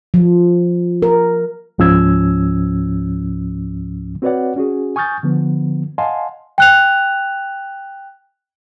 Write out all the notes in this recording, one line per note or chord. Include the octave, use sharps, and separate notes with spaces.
F3
A#4
C#2 G#2 F3 C#4 E6 G#6
C4 F#4 B4 C#5 D5 F#5
C#4 F#4 G#4
G#5 C#6 D#6 F6 G6 A6
D3 F3 B3
D#5 F5 F#5 G#5 A5 C6
G5 F#6 F7